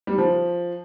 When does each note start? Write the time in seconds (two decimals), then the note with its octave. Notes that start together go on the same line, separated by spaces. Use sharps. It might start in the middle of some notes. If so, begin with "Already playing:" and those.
0.07 G3
0.18 F3